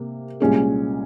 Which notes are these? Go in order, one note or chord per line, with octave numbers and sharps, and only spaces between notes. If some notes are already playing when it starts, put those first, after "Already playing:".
Already playing: C3 A#3
C2 A#2 G#3 C#4 G#4